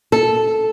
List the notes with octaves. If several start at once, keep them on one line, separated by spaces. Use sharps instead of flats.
A4